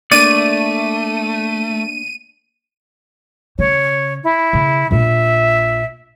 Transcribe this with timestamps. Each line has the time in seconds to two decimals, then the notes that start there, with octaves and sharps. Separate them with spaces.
0.12 A3 A#3 D4 D5 D#7
3.59 C#3 C#5
4.24 E4
4.53 C#3
4.91 A#1 F4 E5